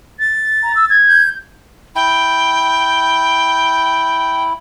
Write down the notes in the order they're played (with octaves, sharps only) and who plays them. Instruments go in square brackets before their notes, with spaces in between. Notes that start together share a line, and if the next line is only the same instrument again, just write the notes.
[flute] A6
[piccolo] A#5
E6
G#6
[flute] G6
[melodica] E4 [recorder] G5